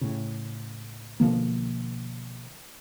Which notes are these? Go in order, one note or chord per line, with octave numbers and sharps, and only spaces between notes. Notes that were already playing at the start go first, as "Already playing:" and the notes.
A2 C#3
B1 D3 F3 A#3